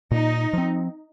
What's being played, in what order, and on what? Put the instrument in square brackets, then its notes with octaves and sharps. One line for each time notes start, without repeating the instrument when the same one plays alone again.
[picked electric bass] A#2 [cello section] D#4
[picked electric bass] F3 C4